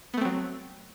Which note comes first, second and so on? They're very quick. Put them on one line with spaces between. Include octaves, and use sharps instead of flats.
B3 A3 C4 F#3